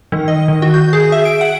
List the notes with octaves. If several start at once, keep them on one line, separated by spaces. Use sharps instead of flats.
D#3
D#5
D#3
F#4
G6
G#4
E5
D7
F#5